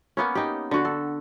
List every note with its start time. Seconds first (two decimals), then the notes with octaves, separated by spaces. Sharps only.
0.17 A#3 B3 C#4
0.35 D#4 G4
0.71 D3 F#4
0.85 A4